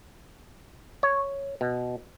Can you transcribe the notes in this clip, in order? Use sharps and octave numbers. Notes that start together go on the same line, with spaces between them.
C#5
B2